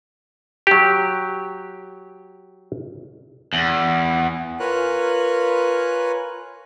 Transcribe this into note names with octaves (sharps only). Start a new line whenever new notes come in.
F#3 G4
E2
F4 A#4 B4 C#5 G#5 F#6